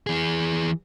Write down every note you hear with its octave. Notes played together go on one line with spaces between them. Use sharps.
E3 G#4